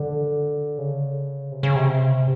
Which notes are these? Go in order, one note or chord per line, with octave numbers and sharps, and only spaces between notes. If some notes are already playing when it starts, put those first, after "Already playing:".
Already playing: D3
C#3
C3
C#3
C3